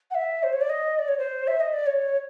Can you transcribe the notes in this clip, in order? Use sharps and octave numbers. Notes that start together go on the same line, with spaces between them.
F#5
E5
C5
C#5
D5
D#5
D5
C#5
C5
E5
D#5
D5
C#5